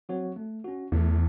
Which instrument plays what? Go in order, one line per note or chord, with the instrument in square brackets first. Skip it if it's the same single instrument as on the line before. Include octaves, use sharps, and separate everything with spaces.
[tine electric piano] F#3 C4 F#4 C#5
A3
C#4 F#4
[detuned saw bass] E2 [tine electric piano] A3